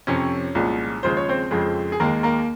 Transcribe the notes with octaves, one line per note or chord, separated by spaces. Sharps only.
F2 C3 F3 C#4 C#5
C2 A#2 F3 G#3
D#2 C#3 F3 G#3 C5
C#5
C4 C5
F2 C#3 F3 G#3
G#4
D#2 D#3 G#3 A#3 A#4
A#3 A#4